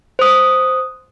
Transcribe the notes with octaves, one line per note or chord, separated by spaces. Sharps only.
C5 D#6